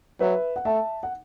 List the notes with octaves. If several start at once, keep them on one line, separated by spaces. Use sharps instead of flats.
F#3 B4 E5
F#5
A3 E5 A5
F#5